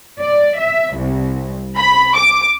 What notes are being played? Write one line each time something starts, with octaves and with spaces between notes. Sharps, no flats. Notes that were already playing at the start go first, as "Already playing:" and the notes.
D5
E5
C2
B5
D6